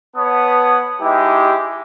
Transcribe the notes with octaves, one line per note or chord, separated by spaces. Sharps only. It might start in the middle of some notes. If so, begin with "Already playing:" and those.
B3 B4 C#5 A5 D#6
G#3 D#4 E4 G4